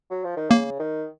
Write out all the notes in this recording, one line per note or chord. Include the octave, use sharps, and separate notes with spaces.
F#3
F3
D#3
C#3 A#3
D#3